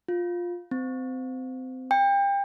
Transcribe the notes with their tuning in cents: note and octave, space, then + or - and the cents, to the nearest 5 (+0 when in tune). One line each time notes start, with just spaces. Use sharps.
F4 +10
C4 -25
G5 +30